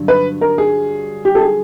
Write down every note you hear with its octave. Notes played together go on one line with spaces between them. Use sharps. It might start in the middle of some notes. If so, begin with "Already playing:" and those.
Already playing: G2 D3 F#3
B4
A#4
G#4
G4
A4
G#4